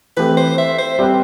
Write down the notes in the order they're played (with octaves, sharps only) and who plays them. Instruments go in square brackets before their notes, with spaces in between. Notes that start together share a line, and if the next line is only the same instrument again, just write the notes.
[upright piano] E3 A3 C4 G4 [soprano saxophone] B4
[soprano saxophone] C5
E5
C5
[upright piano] G3 C4 G4 B4